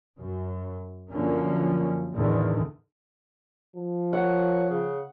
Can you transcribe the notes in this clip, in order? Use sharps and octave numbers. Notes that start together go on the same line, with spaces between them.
F#2
F#2 D3 F3 A#3 C#4
E2 A2 D3 D#3 G#3
F3
A#4 C#5 F#5
C#3